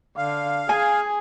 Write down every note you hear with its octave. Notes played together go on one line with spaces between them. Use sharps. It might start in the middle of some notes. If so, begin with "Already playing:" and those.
D3 F5
G#4 G#5